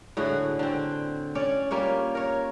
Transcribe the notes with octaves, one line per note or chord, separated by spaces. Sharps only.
A2 D3 F#4 G#4
D3 C4
C#4 C#5 D5
G3 A#3 F4 C#5
A#4 C#5